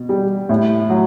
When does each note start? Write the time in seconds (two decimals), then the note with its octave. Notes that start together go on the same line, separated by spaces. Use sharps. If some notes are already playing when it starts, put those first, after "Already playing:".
Already playing: B2
0.09 G3
0.49 A2
0.90 F#3